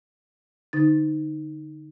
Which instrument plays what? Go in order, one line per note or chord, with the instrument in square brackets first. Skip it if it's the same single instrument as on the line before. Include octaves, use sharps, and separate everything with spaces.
[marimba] D3 D#4 A6